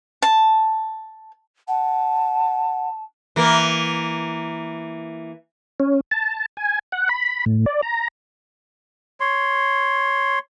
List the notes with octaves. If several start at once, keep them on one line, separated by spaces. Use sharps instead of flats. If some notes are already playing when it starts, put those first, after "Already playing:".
A5
F#5 A5
E3 A#3
C#4
A5
G#5
F#5
B5
A2
D5
A#5
C#5 C6